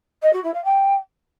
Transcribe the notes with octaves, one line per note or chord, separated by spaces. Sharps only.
D#5
F#4
E4
F5
G5